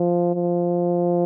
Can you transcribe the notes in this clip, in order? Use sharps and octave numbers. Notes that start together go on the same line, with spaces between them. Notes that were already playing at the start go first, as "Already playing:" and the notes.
Already playing: F3
F3